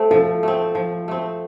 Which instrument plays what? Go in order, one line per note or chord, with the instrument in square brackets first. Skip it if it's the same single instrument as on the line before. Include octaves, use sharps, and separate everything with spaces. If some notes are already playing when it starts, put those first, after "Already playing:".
Already playing: [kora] A3 C4
[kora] F3 [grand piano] A4
[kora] A3 C4
F3
A3 C4